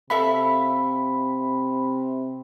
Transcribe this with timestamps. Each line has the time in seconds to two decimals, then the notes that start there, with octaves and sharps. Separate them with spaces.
0.10 C3 A4 E5 F5 B5